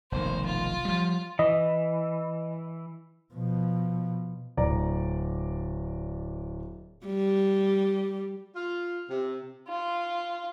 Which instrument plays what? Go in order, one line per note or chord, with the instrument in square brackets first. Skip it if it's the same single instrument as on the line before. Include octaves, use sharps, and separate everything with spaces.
[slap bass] F1 B1 D#3 [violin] A#3 C5
[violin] F4
[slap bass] F3 G3
[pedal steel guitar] E3 [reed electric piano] D#5
[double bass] B2 F3
[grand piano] D1 D5 A#5
[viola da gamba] G3
[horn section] F4
C3
[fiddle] F4